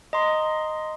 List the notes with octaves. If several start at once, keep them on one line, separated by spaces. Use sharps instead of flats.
D#5 A#5 C6